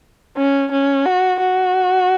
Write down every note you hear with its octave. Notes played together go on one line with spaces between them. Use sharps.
C#4
C#4
F#4
F#4